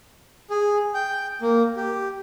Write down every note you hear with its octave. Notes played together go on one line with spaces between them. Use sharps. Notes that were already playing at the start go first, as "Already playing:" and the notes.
G#4
G5
A#3
G4